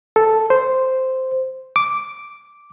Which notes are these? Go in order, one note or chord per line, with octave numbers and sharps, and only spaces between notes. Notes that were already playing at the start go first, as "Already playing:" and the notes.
A4
C5
D6